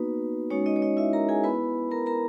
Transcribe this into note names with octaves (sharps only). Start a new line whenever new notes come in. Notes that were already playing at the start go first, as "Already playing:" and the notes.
Already playing: A#3 B3 D#4 F#4 B4
G#3 C#4 D#4 F#4 C#5
D#4 D#5
C#5
D#4 D#5
E4 E5
A#4 A#5
G#4 G#5
B3 E4 B4 B5
A#4 A#5
A#4 A#5